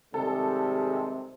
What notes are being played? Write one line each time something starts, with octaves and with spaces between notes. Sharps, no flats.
C3 D#3 G3 G#3 A4